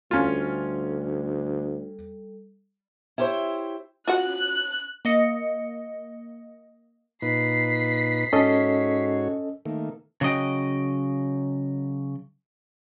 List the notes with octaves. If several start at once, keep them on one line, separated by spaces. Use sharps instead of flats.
D2 G3 C#4 F4 A4
E4 G4 A4 C5 C#5 E5
F4 F#4 F#5 F#6
A#3 D#5 C#7
A#2 D#4 B4 B6 C7
G#2 C#4 F#4 A4 C#5 D#5
D#3 A3 A#3
C#3 F#3 D#5 G5